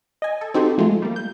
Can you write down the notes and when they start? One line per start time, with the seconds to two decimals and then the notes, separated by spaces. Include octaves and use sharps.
0.22 D#5 G#5
0.41 A4
0.54 C4 D#4 F#4 G4 A4 C5
0.78 F3 G#3 A3 F4
1.02 G3 A#3
1.16 G6